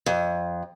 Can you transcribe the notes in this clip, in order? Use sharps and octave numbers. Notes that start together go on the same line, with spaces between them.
F2